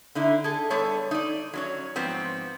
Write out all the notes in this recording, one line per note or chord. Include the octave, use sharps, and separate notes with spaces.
D3 D#4 E4
G#4 A4
G3 B3 A4 C#5
D#4 D5
F#3 C#4 C#5
G#2 F3 B3 C4